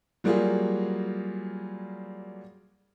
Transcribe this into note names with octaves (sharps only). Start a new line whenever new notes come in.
F#3 G3 A#3 F4 G#4